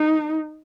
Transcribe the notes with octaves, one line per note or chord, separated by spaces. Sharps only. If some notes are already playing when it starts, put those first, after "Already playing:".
Already playing: D#4